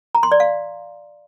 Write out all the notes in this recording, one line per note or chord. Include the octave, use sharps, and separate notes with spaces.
A#5
C6
D5
F5